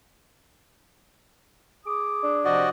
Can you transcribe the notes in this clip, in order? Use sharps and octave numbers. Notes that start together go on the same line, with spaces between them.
G#4 D6 D#6
D4
C3 F3 F#4 G4 D5 D#5